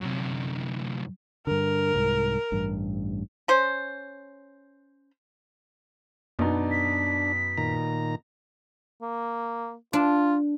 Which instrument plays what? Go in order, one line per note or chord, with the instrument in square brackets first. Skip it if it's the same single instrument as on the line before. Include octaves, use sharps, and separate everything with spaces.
[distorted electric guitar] F#2 C3
[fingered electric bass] G2 D3 [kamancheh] A#4
[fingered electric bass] C2 G#2
A1 G2
[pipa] C#4 C5
[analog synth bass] F#2 [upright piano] B2 B3 D#4 [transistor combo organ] D4
[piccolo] B6
[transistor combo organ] A#2 D#3 A#5
[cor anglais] A#3
[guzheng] D4 [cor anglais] F4